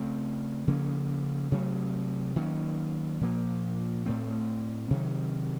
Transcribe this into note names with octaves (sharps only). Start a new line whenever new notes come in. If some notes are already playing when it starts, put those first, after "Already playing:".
Already playing: C#3 A3 C4
C#3 F3 A#3 C#4
C3 F#3 A3
D#3 F#3 A#3 C#4
A#2 F3 A#3
A2 A3 C4
C3 D#3 F#3